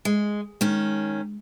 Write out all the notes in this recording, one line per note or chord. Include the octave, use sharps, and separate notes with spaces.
G#3
D#3 G#3 C#4